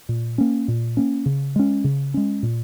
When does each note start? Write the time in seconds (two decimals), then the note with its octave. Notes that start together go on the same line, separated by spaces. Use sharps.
0.09 A#2
0.38 A#3 C#4
0.68 A#2
0.97 A#3 C#4
1.26 C#3
1.56 G#3 C#4
1.84 C#3
2.14 G#3 C#4
2.43 A#2